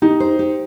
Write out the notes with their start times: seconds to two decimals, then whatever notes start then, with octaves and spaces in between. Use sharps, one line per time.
0.02 D#4 G4
0.20 C5
0.39 G4